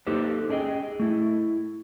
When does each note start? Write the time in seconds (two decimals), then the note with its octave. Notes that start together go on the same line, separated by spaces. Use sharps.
0.07 A#3 D#4 G4 A4 B4 C5
0.49 C#4 D4 G#4 D#5 G5
1.00 A3 E4